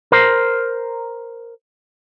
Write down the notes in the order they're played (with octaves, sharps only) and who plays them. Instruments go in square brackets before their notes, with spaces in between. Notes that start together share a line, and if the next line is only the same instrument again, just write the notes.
[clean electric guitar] A#4 C5